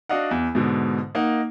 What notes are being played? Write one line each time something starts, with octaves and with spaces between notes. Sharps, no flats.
D4 F#4 D5 D#5 F5 F#5
E2
G#2 B2 D3
A#3 D#4 F#5